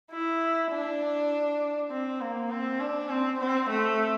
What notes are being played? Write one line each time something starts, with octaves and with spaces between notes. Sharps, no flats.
E4
D4
C4
A#3
C4
D4
C4
C4
A3